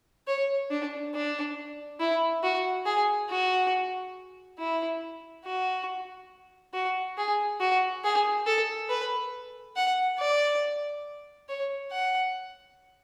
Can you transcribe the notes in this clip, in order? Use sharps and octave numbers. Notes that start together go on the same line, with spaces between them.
C#5
D4
D4
E4
F#4
G#4
F#4
E4
F#4
F#4
G#4
F#4
G#4
A4
B4
F#5
D5
C#5
F#5